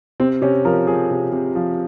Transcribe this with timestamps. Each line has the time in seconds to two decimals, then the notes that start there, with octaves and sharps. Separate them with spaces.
0.20 C3 C4
0.42 C3 C#4
0.65 F3 A#4
0.87 F3 G#4
1.11 C3
1.32 C3
1.55 F3